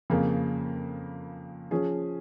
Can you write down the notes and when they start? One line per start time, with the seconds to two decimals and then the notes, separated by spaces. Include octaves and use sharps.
0.10 F2 C#3 A#3
1.71 F3 C#4 G#4